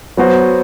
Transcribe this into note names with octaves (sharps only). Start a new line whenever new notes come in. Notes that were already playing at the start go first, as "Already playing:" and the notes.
F#3 B3 F#4 C5